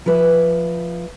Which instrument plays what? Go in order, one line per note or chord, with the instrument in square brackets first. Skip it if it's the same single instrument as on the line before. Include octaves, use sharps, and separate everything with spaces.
[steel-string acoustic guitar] F3 B4 E5